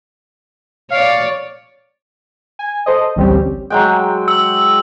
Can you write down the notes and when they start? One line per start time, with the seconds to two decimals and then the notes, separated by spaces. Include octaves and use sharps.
0.91 C#5 D5 F5
2.59 G#5
2.86 A4 C5 D#5
3.16 A1 D2 G3 C4 C#4 G4
3.70 F#3 G#3 G5
4.28 E6